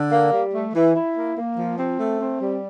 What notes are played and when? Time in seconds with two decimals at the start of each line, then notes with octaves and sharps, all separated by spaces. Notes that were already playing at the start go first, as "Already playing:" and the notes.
Already playing: D3
0.11 A#3
0.32 G3
0.54 A3
0.74 E3
0.95 E4
1.16 A#3
1.37 A#3
1.58 F3
1.79 C4
1.99 A3
2.20 C4
2.41 G3